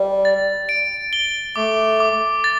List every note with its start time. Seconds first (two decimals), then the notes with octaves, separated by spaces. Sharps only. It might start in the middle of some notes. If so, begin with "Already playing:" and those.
Already playing: G3
0.25 A6
0.69 D7
1.13 G7
1.56 A3 D6
2.00 D6
2.44 A6